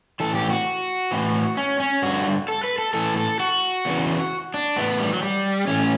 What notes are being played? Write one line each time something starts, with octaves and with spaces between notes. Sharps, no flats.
A2 E3 A4
G4
F#4
A2 E3
C#4
C#4
G2 D3 F#4
A4
B4
A4
A2 E3 A4
A4
F#4
E2 C#3 E3
D4
A2 E3 B3
G3
F#3
G3
A2 E3 C#4